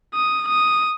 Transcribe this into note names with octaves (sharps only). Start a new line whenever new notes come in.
D#6
D#6